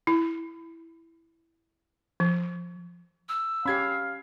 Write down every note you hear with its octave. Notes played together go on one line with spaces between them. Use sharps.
E4
F3
E6
C#4 G4 F5 B5 G#6 C7